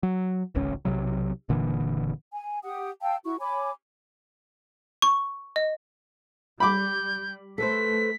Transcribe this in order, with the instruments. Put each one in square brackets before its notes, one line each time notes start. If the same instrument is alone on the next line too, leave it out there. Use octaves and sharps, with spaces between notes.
[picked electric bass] F#3
D1 G#1 C#2 C#4
B1 C3 F#3
F#1 A#2 D3 E3
[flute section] G#5
G4 F#5 D#6
F5 G5 A5 E6
E4 F#4 C#6
C#5 G#5 B5 D6
[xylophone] C#6
D#5
[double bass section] G3 [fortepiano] B5 D6 [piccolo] G6
[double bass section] A3 [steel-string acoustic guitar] A4 B4 C5 [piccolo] B6